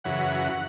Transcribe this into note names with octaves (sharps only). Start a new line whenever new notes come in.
F#2 C#3 E3 F#5